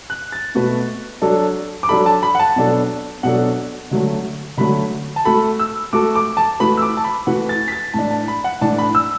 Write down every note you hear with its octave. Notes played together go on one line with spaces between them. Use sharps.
F#6
A6
B2 A3 F#4 B4
F#3 D4 A4
D6
F#3 D4 A4 B5
A5
B5
F#5
A5
B2 F#3 D4 A4
B2 F#3 D4 A4 F#5
D3 F#3 A3
D3 F#3 A3 B5
A5
A3 F#4 A4 B5
E6
A3 F#4 A4 D6
D6
A5
E3 A3 F#4 B4 B5
E6
D6
A5
B5
E3 A3 F#4 B4 F#5
A6
B6
A6
A2 E3 D4 A5
A5
B5
F#5
A2 E3 D4 A5
B5
E6